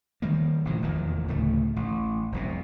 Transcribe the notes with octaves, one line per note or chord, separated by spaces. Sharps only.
D#3 G3 A#3
A1 A2 C3 F3
F1 E2 A#2 D#3
D2 A2 C#3 A3
A1
F1 C2 B2